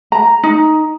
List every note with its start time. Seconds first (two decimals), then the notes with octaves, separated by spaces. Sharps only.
0.12 A#5
0.43 D#4